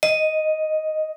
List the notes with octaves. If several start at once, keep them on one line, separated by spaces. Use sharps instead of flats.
D#5